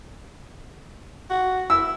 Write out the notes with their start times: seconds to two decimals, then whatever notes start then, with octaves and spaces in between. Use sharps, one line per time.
1.30 F#4
1.70 E4 E6